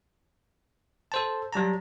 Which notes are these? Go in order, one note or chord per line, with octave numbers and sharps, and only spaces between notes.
A4 C5 A5
F#3 G3 A5 A#5